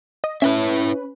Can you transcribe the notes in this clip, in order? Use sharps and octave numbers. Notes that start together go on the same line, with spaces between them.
D#5
C#4 E4 B4 C#5 E5